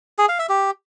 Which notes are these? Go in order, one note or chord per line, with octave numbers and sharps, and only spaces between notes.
G#4
F5
E5
G4